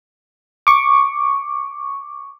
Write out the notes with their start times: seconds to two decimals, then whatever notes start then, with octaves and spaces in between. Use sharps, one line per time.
0.67 C#6 D6